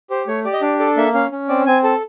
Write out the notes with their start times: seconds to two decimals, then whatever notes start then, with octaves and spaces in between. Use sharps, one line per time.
0.10 G4 C5
0.27 A3 C#5
0.45 G4 D5
0.53 D#5
0.61 D4 D5
0.79 A4 D5
0.97 A#3 E5
1.14 C#4 F5
1.32 C#4
1.49 C4 D5
1.66 C4 G#5
1.84 A4 A5